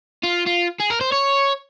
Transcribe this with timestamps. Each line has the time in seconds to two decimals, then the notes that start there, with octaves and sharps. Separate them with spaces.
0.23 F4
0.46 F4
0.80 G#4
0.90 A#4
1.01 C5
1.12 C#5